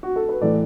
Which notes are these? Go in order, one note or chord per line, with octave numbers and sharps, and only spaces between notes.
F#4
A4
B4
A2 E3 A4 D5